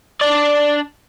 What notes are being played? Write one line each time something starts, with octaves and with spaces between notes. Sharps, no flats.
D4 D5